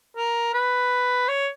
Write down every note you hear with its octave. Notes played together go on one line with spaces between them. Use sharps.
A#4
B4
C#5